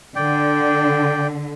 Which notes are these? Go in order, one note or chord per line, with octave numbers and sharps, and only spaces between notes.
D3 D5 G5